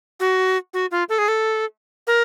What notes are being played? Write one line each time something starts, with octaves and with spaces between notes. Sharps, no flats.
F#4
F#4
F4
A4
G#4
A4
A#4